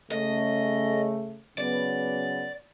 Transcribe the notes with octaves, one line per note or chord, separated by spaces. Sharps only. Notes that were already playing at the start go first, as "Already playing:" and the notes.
C#3 A3 D#5
C#3 F#3 B3 D5